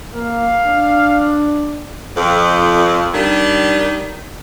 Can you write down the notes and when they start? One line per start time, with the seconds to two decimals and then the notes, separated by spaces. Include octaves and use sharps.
0.14 A#3 F5
0.66 D4
2.16 F2
3.13 D#3 G3 D4